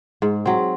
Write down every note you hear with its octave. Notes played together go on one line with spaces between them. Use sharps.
G#2
F#3 C4